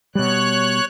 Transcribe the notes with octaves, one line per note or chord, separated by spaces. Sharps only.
B2 G3 C#5 F#6